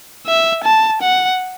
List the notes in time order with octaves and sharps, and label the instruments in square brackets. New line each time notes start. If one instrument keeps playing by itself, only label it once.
[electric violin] E5
A5
F#5